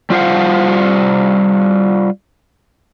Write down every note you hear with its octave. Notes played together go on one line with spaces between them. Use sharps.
G3 F4 C5 F5 F#5